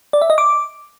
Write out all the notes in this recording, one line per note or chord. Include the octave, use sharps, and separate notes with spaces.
D5
E5
D#5
D6